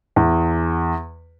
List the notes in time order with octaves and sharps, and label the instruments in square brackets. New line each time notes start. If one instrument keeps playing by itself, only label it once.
[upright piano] E2